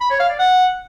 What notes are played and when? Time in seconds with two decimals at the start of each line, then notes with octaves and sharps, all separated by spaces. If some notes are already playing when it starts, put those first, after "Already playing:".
0.01 B5
0.10 C#5
0.20 F5
0.29 D5
0.39 F#5